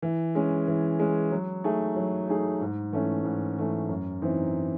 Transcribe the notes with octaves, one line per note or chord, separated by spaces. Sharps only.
E3
G#3 C#4
E3
G#3 C#4
F#3
A3 D#4 G#4
F#3
A3 D#4 G#4
G#2
E3 A3 C#4
G#2
E3 A3 C#4
F#2
E3 C4 D#4